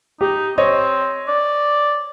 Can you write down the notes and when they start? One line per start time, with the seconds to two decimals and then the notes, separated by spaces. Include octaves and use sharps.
0.21 D#4 G4
0.58 C4 C5 C#5 D#5
1.28 D5